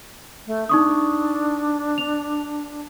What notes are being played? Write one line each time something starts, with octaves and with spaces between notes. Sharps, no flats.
A3
D4 D#4 C#6 D#6
F7